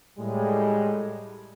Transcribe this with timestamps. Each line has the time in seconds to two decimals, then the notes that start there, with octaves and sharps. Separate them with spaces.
0.18 A2 G3 G#3